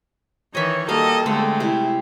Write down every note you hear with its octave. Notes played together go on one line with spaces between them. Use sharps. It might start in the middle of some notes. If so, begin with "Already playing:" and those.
D#3 E3 C#5 D#5 E5
G3 A#3 F#4 A4 D#5 F5
D3 G#3 A3 C4
C3 E4